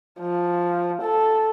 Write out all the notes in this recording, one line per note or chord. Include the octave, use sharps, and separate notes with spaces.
F3
A4